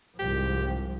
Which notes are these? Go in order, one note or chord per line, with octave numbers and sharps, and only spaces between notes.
C2 G#2 F3 G4